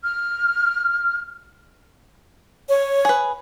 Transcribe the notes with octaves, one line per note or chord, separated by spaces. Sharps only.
F6
C#5
G#4 B4